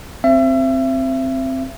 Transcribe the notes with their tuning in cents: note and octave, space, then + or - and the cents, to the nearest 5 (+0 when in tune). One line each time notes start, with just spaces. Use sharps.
C4 +0 E5 +35